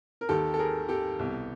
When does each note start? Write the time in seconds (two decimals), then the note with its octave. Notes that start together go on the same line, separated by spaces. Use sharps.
0.21 A#4
0.29 D#2 D#3 G4 A4
0.54 A4
0.59 G#4 A#4
0.89 G4 A4
1.19 C2 B2